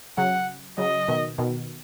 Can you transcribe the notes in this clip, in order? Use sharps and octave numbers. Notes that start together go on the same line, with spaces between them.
C#3 F#3 F#5
C#3 F#3 D#5
B2 D#3
B2 D#3